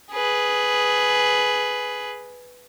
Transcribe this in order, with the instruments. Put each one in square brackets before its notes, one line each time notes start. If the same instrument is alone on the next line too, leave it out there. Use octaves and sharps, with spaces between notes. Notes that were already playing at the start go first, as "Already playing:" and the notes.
[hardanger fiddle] G#4 B4